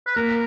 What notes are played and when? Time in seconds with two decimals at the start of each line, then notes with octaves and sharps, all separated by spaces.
0.07 B4
0.16 A#3 A#4